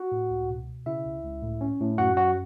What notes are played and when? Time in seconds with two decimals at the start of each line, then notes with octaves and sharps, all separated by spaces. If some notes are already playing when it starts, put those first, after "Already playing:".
Already playing: F#4 F#5
0.12 A2
0.30 C#2
0.49 B2
0.68 B2
0.86 C#3 E4 E5
1.05 C#2
1.23 C#2
1.42 A2
1.61 C#4
1.80 A2
1.98 F#2 F#4 F#5
2.17 F#3 F#4 F#5